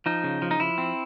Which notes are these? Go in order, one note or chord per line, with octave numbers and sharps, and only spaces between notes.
F3 D#4
C#3
F3
D#4
F3 E4
C4